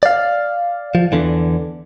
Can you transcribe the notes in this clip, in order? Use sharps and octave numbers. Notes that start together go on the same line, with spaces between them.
D5 F5
F3
E2 D3 E3